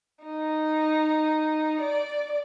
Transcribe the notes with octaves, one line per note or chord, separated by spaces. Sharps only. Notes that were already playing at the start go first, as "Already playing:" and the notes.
D#4
D5